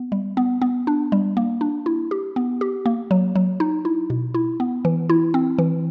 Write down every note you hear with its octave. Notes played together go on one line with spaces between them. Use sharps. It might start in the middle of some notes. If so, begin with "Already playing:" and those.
Already playing: B3
G3
B3
B3
D4
G3
A#3
D4
E4
G4
B3
G4
A#3
F#3
F#3
D#4
E4
B2
E4
B3
E3
E4
C4
E3